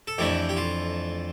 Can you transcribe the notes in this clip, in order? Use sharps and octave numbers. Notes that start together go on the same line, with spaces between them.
A4
F2 E3 A3 D4 G4
G4
F4